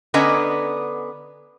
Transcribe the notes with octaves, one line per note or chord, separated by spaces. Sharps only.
D3 B3 C#4 D#5 G#5 A#5